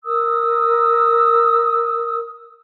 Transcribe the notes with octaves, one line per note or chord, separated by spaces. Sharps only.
A#4 D#6 E6